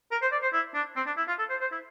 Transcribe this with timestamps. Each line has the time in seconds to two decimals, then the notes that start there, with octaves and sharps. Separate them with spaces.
0.11 A#4
0.22 C5
0.32 D5
0.42 C5
0.53 E4
0.75 D4
0.96 C4
1.06 D4
1.17 E4
1.28 F4
1.39 A4
1.50 C5
1.61 C5
1.72 E4